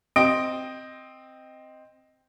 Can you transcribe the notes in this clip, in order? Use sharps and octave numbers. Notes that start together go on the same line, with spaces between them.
C4 D#5 D7